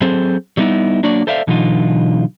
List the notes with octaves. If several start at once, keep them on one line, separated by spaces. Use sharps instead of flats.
F#3 C4 G#4 A4 C5
F#3 G3 A3 B3 D#4 E4
F#3 A#3 D4 F#4 D5
A4 C5 D5 E5 F5
B2 D3 E3 F#3 D#4 F4